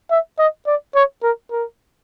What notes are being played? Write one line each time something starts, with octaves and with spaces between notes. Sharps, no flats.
E5
D#5
D5
C#5
A#4
A#4